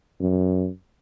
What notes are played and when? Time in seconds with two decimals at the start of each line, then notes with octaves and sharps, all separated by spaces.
0.20 F#2